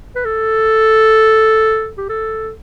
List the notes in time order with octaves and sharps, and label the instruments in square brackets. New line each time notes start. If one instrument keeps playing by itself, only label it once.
[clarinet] B4
A4
G4
A4